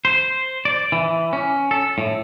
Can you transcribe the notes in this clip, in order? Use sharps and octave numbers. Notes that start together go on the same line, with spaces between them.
C5
D5
E3
C#4
A4
A2